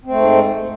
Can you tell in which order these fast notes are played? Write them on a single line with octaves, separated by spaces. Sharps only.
C4 A3 G#2